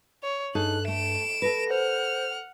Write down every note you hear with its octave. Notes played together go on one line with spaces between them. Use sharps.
C#5
G2 D#4 G#4 A4 F#6
A3 D7 E7
A4 B4 A#6
C5 F#5 F6